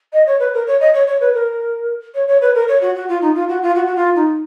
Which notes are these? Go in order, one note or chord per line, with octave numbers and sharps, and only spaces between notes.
D#5
C#5
B4
A#4
C#5
D#5
C#5
C#5
B4
A#4
C#5
C#5
B4
A#4
C#5
F#4
F#4
F4
D#4
F4
F#4
F4
F#4
F#4
F4
D#4